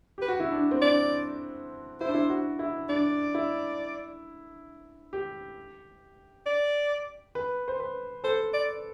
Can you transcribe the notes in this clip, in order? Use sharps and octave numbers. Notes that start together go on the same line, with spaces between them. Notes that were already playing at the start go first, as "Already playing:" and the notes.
G4 B4
F#4
E4
D4
C4
D4 D5
E4 C5
D4
E4
F#4
E4
D4 D5
E4
G4
D5
B4
C5
B4
A4 C5
D5